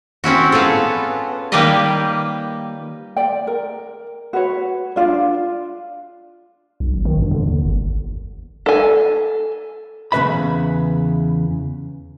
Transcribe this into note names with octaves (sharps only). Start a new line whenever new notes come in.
C4 C#4 E4 F#4
B3 F4 G#4 A4
D#3 G3 A#3 G4 B4 D#5
D5 G5
A#4
F#4 B4 C#5
D4 D#4 F4 D5
B1
G#1
D#3
G2
D3
D#2
G1
A4 G#5
E2 C#3 A#3 B4 E5 B5